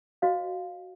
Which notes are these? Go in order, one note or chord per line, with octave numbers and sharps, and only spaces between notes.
F#4 C5 D#5 F5